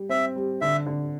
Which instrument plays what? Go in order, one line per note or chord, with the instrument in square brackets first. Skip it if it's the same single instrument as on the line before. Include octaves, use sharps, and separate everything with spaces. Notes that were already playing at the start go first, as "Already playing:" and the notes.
Already playing: [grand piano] G3
[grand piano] C4 [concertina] E5
[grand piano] G3
[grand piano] D3 [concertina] E5
[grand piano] D3